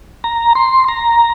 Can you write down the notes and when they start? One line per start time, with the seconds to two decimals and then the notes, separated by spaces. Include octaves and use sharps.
0.24 A#5
0.55 C6
0.88 A#5